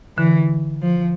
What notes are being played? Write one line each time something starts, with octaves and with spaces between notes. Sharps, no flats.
D3 E3
F3